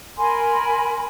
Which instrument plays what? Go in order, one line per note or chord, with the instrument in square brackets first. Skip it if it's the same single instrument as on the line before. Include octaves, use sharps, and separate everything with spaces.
[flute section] A#4 G#5 B5 C6